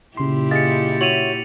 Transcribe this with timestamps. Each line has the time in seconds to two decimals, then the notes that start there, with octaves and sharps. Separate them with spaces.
0.17 A#2 C#3 E4 G4 C6
0.51 G#4 D#5 F5 A6 C#7
1.01 F#4 C#5 E5 D#7 F7 F#7